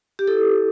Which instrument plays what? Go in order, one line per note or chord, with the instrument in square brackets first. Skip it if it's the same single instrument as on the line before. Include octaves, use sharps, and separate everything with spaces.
[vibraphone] G4
E4 A4